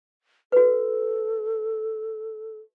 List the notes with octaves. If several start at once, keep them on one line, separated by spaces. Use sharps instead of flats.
F#4 A4 B4